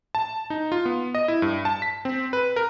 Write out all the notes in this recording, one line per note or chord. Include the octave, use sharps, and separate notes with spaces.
A5
D#4
F4
B3
D#5
E4
G2
A5
B6
C4
B4
A#4